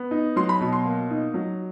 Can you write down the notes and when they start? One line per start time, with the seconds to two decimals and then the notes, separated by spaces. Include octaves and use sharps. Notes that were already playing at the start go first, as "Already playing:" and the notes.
Already playing: B3
0.11 D#4
0.36 F#3 C6
0.49 B5
0.61 B2
0.73 C6
0.85 A#3
1.11 D#4
1.34 F#3